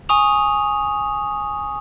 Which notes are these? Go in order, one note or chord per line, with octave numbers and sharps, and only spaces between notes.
G#5 C#6 D#6 F7